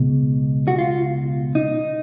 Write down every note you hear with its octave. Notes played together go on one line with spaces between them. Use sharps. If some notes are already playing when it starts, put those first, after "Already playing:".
Already playing: C#2 B2
F#4
F4
D#4